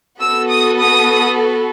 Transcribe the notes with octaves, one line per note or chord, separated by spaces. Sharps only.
B3 F#4 A4 E6
D#6
D#6